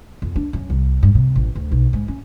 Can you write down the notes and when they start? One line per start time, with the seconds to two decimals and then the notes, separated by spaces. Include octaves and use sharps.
0.22 F2
0.36 D4
0.53 F#2
0.70 C2
1.03 G2
1.15 C3
1.35 A1
1.55 D2
1.71 B1
1.93 G#2
2.08 C#4